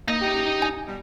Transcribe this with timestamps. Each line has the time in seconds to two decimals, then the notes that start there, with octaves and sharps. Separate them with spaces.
0.08 A#3 D#4 D#5 A#6
0.21 C#3 E4 G4
0.62 G#5
0.87 B2 G3